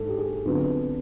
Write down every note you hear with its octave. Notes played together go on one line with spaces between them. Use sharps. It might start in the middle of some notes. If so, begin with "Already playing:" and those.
Already playing: G#2 A4
G4
G#4
F2 D3 F#3 B3